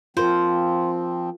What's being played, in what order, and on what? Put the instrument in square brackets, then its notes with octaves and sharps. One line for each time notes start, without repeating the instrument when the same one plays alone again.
[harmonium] F3 C4 [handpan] F4 A#4 [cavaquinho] C5